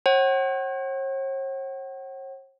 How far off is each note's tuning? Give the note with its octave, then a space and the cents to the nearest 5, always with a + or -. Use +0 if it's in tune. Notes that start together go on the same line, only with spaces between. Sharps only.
C#5 -45 F#5 +35